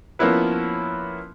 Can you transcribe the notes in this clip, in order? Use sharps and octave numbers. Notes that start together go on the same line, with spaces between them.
F3 A#3 B3 C#4 E4 B4